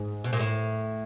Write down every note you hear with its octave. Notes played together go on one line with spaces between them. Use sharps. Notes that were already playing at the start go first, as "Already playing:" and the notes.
Already playing: G#2
B2
A#2
A2